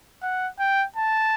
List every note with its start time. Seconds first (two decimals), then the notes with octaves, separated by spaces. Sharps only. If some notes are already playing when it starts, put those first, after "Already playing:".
0.22 F#5
0.59 G5
0.96 A5